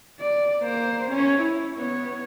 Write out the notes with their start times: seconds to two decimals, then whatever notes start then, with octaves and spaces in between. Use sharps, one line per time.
0.20 D5
0.61 A#3 C5
1.11 C#4 C#5
1.42 E4
1.76 B3 C#5